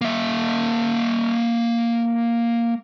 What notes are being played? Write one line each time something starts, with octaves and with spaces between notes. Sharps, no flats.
A#3 E5